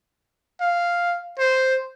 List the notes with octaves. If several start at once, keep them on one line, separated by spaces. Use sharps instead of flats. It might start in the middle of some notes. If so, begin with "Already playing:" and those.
F5
C5